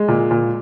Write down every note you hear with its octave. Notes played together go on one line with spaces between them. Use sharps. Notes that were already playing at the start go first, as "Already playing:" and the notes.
Already playing: G#3
A#2
A#2